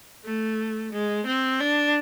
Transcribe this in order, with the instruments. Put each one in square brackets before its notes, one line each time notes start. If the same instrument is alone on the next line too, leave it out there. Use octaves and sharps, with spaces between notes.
[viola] A3
G#3
C4
D4